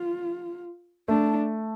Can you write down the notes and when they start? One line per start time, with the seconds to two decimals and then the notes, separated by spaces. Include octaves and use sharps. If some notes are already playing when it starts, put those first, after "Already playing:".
Already playing: F4
1.08 A3 D4